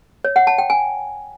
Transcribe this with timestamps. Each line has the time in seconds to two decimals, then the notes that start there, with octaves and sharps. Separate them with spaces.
0.24 C#5
0.36 F#5
0.47 A5
0.58 G5
0.70 G#5